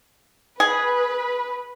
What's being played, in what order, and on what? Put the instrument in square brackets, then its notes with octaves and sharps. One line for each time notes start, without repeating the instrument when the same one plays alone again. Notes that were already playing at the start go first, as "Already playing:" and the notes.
[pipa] G#4 [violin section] B4